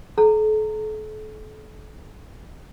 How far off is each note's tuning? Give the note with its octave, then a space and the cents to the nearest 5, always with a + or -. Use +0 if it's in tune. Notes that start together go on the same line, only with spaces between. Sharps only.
A4 -40 A#5 -25